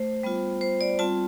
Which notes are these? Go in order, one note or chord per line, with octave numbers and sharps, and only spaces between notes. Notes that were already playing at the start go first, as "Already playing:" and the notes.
Already playing: A3 C5
G3 B3 F4
C5
D5
G3 C4 F4 A5